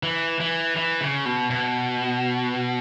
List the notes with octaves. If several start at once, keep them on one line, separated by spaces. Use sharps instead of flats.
E3
E3
E3
C#3
B2
B2